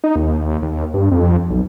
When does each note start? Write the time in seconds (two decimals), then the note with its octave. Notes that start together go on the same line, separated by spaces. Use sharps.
0.04 D#4
0.16 D#2
0.62 D#2
0.94 G2
1.11 F2
1.50 B1